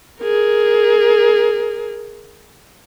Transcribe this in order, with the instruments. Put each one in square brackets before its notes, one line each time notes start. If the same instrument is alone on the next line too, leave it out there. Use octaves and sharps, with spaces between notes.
[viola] G#4 A#4